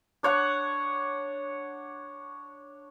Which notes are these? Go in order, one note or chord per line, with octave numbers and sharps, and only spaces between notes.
D4 C#5 F#5